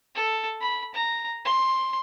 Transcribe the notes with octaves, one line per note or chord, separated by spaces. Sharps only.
A4
B5
A#5
C6